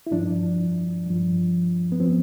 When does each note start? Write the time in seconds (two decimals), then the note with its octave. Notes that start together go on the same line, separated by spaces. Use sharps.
0.07 E4
0.11 G2 F3 D4
1.06 G2 F3
1.92 B3
2.00 F3 C4